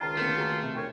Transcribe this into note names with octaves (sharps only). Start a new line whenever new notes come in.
C#2 D#3 F4 G5 A5 A#5
D3 A3 A#3 C4
F#4 G#4 A#5
C3
D2 A#4 C#5 G5